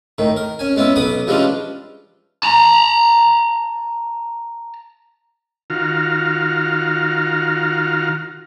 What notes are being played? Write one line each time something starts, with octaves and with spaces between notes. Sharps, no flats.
A2 D#3
A#4
C#4 G#5
G#3 B3 C#4 E4
B1 B3 B5 D6 D#6
E3 F3 G3 G#3 C#4 D4
A5 A#5
D#3 F4 F#4 A#5 F6